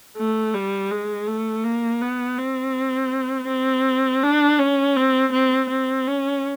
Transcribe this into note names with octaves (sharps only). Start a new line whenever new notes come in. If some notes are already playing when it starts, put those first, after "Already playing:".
A3
G3
G#3
A3
A#3
B3
C4
C4
D4
C#4
C4
C4
C4
C#4